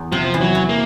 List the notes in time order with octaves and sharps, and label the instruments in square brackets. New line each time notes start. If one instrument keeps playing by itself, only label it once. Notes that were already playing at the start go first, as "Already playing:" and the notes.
Already playing: [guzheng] E2
[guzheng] C3 [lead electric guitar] F3
[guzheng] E3
[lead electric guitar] F#3
[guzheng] E3
[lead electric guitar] A#3